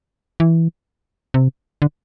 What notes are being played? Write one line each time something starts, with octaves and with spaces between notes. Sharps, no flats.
E3
C3
D3